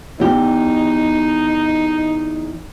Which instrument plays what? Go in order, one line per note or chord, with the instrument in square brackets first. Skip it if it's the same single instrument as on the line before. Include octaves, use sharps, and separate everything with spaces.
[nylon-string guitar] E2 G4 [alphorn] D#4